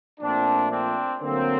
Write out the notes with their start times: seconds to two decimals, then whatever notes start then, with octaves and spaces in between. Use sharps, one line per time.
0.20 A#2 F3 A3 C4 D4
0.70 C4 D4
1.20 D3 F#3 A3 A#3 C4